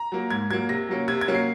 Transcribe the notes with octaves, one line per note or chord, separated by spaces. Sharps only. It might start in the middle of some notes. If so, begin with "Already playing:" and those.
Already playing: A#5
F#3 A#3
G#2 G#6
F#3 A#3 G#6
C3 A#6
F#3 A#3 C#4
C3 G#6
G#6
F#3 A#3 C#4
C7